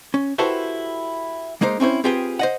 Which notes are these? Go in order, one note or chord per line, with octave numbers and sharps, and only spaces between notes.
C#4
E4 F#4 G4 A4 B4 C5
G#3 A#3 D#4 C5
C4 C#4 E4 C5
C4 F4 G4 G#4 B4 G5
C5 D#5 F#5